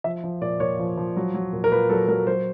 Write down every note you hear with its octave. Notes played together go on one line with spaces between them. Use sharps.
F3 E5
F3
A#2 D5
A#2 C#5
F3
F3
F#3
F#3
A#2
A#4
A#2 B4
F#3 A4
F#3 A#4
F#3 C5